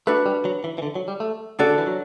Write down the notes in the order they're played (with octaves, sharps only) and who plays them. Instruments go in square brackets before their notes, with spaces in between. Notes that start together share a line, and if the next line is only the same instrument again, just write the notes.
[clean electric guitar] A3 [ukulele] D4 F#4 B4
[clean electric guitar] G3
F#3
E3
E3
D3
F#3
G3
A3
[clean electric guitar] C#3 [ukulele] D4 F#4 A4 D5
[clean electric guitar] D3
E3
F#3